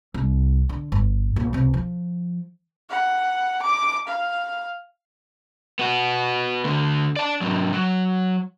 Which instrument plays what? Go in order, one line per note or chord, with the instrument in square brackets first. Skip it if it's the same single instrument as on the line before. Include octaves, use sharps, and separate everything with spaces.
[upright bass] C2
D3
G1
A#1
C#2 C3
F3
[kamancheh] F#5
D6
F5
[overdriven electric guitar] B3 F#4
D2 D3
D5 A5
G#2 F#3
F#3